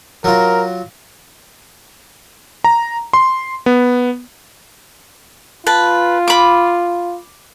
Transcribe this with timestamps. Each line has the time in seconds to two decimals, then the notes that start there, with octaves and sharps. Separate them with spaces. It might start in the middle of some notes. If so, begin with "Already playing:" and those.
0.24 F#3 F4 A#4
2.64 A#5
3.13 C6
3.66 B3
5.67 F4 B4 A5
6.28 B5 D6